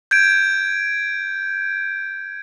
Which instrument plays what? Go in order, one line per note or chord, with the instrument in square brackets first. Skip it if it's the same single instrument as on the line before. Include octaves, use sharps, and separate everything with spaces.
[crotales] G6 G#6 D7